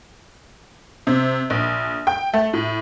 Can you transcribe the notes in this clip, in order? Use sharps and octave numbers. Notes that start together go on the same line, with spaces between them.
C3
A#1
G5
A3
A2